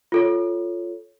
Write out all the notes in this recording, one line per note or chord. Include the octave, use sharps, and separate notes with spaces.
F4 A4 C#5